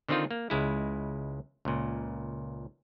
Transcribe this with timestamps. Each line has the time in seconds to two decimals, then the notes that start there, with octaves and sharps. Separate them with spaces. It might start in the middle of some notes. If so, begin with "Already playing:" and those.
0.09 D3 D#3 C4 D#4 F4
0.31 A#3
0.50 C#2 G#3 E4
1.65 C#2 A#2